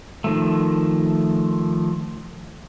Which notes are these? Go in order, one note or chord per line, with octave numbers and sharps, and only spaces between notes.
D#3 F3 A3